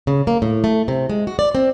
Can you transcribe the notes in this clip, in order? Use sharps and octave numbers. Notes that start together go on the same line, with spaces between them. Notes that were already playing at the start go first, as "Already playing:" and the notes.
C#3
A#3
A2
A3
C3
G#3
F#4
D5
C4